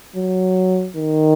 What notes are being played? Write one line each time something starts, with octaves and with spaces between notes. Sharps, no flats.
F#3
D#3